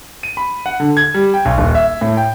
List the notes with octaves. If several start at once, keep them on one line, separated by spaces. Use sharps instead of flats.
D#7
B5
F#5
D3
G#6
G3
G5
B1
D#1
E5
A2
G5